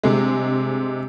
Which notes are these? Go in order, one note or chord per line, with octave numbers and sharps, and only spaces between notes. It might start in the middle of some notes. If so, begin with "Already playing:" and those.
G2 C3 G#3